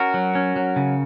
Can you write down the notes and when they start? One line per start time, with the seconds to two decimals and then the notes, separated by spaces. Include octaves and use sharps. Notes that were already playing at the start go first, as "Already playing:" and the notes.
Already playing: C#4 F#4 A#4
0.14 F#3
0.35 C#4
0.56 F#3
0.76 C#3